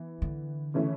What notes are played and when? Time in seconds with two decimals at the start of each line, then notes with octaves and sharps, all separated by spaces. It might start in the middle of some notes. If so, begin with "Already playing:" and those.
Already playing: E3 B3
0.22 D3
0.74 C#3 E3 A3 C#4 E4